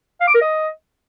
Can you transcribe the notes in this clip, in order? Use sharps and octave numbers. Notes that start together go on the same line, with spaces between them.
F5
D6
A#4
D#5